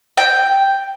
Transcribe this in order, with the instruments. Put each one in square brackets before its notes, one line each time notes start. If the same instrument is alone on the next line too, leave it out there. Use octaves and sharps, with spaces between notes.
[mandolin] G5